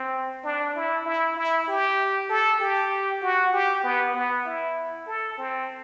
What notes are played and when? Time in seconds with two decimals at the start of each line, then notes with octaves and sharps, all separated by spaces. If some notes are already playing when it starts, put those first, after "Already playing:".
Already playing: C4
0.44 D4
0.76 E4
1.06 E4
1.37 E4
1.68 G4
2.30 A4
2.60 G4
3.22 F#4
3.53 G4
3.84 B3
4.14 B3
4.46 E4
5.07 A4
5.38 C4